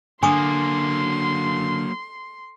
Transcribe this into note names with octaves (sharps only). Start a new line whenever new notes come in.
D3 F#3 A#3 G#5 C6 C#6 D#6